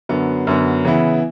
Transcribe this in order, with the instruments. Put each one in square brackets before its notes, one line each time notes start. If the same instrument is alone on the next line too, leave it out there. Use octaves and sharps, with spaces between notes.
[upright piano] F#2 D3 F#3 B3
F#2 D3 F#3 B3
C#3 E3 B3 E4